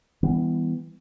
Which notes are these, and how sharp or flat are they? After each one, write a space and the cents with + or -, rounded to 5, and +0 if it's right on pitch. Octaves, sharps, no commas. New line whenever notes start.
E3 +0 G3 +40 B3 +10